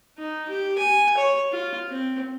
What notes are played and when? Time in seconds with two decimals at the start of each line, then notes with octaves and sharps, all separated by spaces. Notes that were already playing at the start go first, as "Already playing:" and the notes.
0.18 D#4
0.49 G4
0.78 G#5
1.17 C#5
1.52 F4
1.89 C4